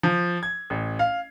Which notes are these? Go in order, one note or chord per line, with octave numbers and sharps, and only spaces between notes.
F3
G#6
A1
F5